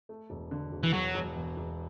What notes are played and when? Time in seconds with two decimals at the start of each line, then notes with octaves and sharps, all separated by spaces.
0.09 A3
0.30 E1
0.51 D3
0.72 E1
0.83 E3
0.93 E1 F#3
1.15 E1
1.36 E2
1.57 E1